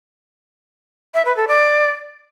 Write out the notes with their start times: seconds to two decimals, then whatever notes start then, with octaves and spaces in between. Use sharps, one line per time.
1.14 E5
1.25 B4
1.37 A4
1.48 D5